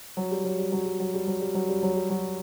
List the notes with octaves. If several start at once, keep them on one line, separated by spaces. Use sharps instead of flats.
F#3
G3
F#3
G3
F#3
G3
F#3
G3
F#3
G3
F#3
G3
F#3
G3
F#3